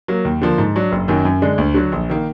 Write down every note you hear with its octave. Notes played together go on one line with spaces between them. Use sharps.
F#3 A#3
D#2
D3 F3 A#3
G#2
F#3 D4
F#1
F#2 D#3 F#3
F#2
D3 G#3 D4
D2
D3 F#3
A#1
D#3 A#3